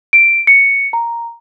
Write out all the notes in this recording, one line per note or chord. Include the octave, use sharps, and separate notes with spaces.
D7
C#7
A#5